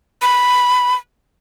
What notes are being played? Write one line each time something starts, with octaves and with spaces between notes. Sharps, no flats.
B5